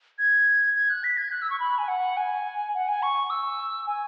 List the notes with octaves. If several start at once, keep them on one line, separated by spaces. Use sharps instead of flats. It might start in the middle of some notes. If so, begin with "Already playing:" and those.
G#6
G#6
F#6
B6
G#6
F#6
E6
C#6
B5
G#5
F#5
G#5
F#5
G#5
C#6
E6
G#5